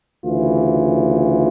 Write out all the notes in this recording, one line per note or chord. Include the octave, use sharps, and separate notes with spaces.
D2 C#3 E3 F4